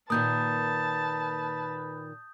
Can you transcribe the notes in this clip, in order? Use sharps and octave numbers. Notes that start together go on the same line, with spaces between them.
A#2 D#3 A#3 B4 A5 D#6 G6